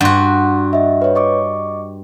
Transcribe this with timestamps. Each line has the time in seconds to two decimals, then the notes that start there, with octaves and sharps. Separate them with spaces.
0.01 G2 F#4 F#5 C6
0.73 D#5 E5
1.02 B4 C#5
1.15 D#5 C#6 D6